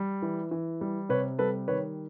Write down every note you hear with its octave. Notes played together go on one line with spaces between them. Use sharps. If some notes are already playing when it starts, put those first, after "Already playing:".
Already playing: G3
E3
E3
G3
C3 B4 C#5
G3 A4 B4
D#3 B4 C#5